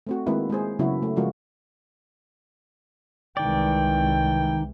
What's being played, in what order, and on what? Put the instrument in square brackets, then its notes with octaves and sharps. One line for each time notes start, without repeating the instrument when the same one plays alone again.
[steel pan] A3 C4 F#4
D#3 G#3 A#3 C4 E4 B4
G#3 A#3 G#4 C5
C#3 F#3 A#3 B3 E4 F#4
A3
C#3 F3 G#3 F4 F#4 A#4
[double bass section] C2 E3 G#3 [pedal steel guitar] D#3 D5 [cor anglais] G5